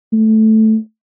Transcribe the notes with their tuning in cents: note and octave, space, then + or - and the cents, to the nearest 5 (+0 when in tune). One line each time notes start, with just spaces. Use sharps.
A3 -5